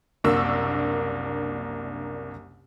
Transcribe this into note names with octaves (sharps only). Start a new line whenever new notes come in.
F#1 C2 A#3 D4 C#6 E6